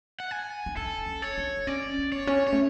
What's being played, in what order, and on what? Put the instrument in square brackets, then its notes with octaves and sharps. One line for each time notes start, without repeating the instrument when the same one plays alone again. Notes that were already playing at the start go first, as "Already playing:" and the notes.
[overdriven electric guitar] F#5
G#5
[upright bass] D4
[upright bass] C#4 [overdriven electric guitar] A4
[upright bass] C#4
[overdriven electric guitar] C#5
[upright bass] D4
[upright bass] C#4 [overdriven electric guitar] D5
[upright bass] B3
[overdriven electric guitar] C#5
[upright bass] C#4
[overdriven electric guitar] C#5
[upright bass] A3